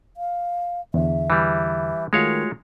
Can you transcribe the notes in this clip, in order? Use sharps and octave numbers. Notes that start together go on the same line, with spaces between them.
F5
E2 D3 E5
E3 G3
D#3 G#3 A3 F4 F#4 C#5 F5